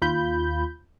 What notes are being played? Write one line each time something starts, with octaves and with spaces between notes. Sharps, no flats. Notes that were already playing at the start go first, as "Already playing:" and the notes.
D#2 F4 B5 G6